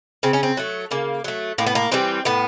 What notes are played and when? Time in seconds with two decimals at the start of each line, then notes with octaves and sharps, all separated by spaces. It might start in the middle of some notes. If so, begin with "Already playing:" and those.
0.23 C#3 C4
0.33 C#4
0.43 C4
0.57 F#3 A3
0.91 C#3 A#3
1.24 F#3 A3
1.58 A2 A#3
1.66 B3
1.75 A#3
1.92 E3 G3 C4
2.25 A2 B3